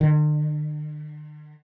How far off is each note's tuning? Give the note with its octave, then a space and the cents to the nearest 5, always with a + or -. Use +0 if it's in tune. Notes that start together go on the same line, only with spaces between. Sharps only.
D3 +45